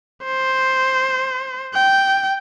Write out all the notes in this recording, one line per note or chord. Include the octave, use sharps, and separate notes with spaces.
C5
G5